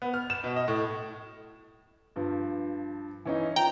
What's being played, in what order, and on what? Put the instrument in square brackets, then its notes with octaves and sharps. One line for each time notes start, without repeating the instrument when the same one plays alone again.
[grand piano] B3
F6
E7
B2
D#5
A2
G2 F3
E3 C#4 D#4
[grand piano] F3 [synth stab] G5 A#5